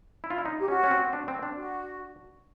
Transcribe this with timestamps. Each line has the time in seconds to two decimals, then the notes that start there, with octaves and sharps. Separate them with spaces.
0.24 E4
0.30 F4
0.38 E4
0.46 D#4
0.60 G4
0.68 C#4 F#4
0.84 C#4
0.91 C4
1.13 D4
1.28 C4
1.43 D4
1.57 F#4